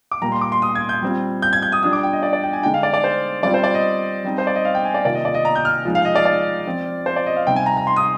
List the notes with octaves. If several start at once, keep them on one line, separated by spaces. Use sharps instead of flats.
D6
A#2 G3 A#3 A#5
C6
D6
C6
D#6
G#6
G6
G3 C4 F4
G6
G#6
G6
D#6
G3 D4 F4 D#6
D6
G5
D#5
D5
D5
G5
G#5
D3 G#3 D#4 G5
F5
D5
D5
C5
G3 C4 F4 D5
C5
D5
D#5
G3 C4 D#4
C5
D5
D#5
F5
G5
G#5
D5
C3 D#3 A#3 F4 D5
D#5
D5
D#5
A#5
G6
F6
F3 G#3 D#4
F5
D#5
D5
D5
F3 C4 F4
C5
D5
D#5
F5
C3 G3 C4 D#4 G5
G#5
A#5
A#5
C6
D#6